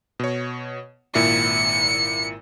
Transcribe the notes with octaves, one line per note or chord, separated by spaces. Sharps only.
B2 C#5
G#1 A#2 E4 C#7